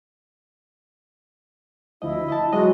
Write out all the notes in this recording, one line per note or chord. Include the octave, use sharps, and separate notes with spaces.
D2 F3 E4 D#5
D#5 A5
F#3 G#3 F#4 D#5